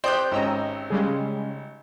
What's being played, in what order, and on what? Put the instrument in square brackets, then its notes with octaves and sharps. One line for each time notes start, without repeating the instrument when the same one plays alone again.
[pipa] C4 G4 [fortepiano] D5 D#6 F#6 [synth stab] G6
[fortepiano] G#1 C#4 [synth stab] D#5 A#5 E6
[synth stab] C#3 G3 G#3